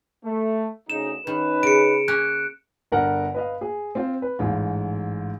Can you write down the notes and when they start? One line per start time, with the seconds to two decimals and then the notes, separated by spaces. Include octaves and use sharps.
0.25 A3
0.90 D2 C#3 D#4 E7
1.27 D#3 C#4 D#4 B4
1.63 C#3 C#7 D7
2.08 A#3 C#4 F#6
2.92 G1 G2 A#4 F#5
3.34 B4 D#5 F5
3.61 G#4
3.95 C4 F4 C5
4.22 B4
4.39 A1 G#2 F4